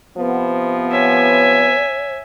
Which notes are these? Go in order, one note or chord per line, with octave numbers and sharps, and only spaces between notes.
C3 F3 B3
C#5 E5 G#5